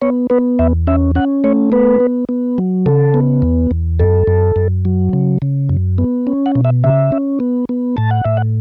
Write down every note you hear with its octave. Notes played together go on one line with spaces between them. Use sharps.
B3 C#5
B3 B4
E2 E5
C#4 E5
C#4 F#5
A3 C#5
B3 B4
B3
B3
F#3
C#3 A4
B3
E2
E2
F#2 A4
F#2
F#2
F#3
C#3
C#3
F#2
B3
C#4
F#5
B2
E5
C#3 E5
C#4
B3
B3
A2 A5
F#5
A2 E5
F#5